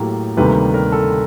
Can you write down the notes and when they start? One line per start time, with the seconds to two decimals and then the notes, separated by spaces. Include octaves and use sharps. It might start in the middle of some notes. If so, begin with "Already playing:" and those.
Already playing: A2 F#3 A#3 G4
0.37 D2 C3 D#3 G3 A#3 B4
0.74 A#4
0.92 A4